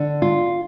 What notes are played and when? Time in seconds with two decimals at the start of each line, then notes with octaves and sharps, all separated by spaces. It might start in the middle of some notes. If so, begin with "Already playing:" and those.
Already playing: D3
0.22 F4